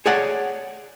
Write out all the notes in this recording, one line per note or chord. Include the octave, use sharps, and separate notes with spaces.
G#4 C#5 D5 F#5